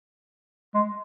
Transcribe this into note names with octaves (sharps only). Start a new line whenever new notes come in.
G#3